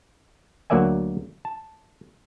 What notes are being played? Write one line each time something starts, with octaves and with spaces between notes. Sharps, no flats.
D2 F#3 A#3 D5 E5 G#5
A5